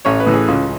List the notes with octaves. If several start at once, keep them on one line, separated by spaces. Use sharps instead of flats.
A1 C#5
B4
A2 E3
G#4
C#2 F4